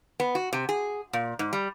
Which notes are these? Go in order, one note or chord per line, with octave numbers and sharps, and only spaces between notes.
B3
F#4
C3
G#4
A#2
G#2
G3